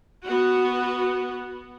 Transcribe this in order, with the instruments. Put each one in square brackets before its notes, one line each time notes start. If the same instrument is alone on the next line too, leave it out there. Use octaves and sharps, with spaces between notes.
[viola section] B3 F#4